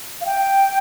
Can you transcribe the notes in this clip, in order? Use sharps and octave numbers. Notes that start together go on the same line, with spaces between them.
F5
G5